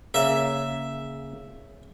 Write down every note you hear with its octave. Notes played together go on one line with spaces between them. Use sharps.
C#3 A#3 E5